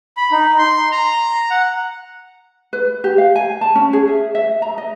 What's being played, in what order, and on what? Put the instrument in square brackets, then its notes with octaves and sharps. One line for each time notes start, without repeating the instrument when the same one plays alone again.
[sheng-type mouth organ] B5
D#4
C6
A#5
F#5
[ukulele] B4
G4
F5
G#5
A5
C#4
G#4
E5
E5
A#5
D#5